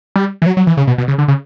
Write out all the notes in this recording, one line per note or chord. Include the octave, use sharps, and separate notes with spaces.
G3
E3
F#3
F#3
E3
C#3
B2
B2
C#3
D3
C#3